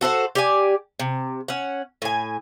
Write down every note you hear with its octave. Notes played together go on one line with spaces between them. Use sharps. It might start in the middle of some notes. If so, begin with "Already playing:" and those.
F#4 A4 C5 F#5
G4 D5 G#5
C3
C#4 F#5
A2 G#5